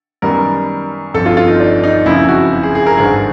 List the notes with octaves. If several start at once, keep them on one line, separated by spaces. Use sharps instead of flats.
F#2 D#3 G3 B3 A#4
G1 F2 D3 A4
F4
F4
D#4
D4
D#4
F#1 F2 C#3 F3 A#3 E4
F#4
G#4
G#4
A#4
G#1 G2 D3 G#4